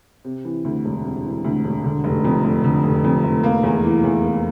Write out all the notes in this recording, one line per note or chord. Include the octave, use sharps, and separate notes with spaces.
C3
E3
D2
E1
C3
E3
D2
E1
D3
F1
F2
F1
D3
F1
F2
F1
A#3
E2
E3
E2
A#3